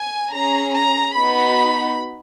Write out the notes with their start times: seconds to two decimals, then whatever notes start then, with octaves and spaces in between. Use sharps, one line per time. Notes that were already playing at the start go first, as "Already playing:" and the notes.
Already playing: G#5
0.32 C#4 G#4 A#5
0.75 A#5
1.17 B3 D#4 F#4 B5